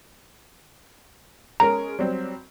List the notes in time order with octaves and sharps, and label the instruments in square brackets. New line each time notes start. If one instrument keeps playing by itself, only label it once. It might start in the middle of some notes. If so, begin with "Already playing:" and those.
[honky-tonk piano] G#3 C#4 A#4 [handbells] A#5
[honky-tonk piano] F#3 G3 C4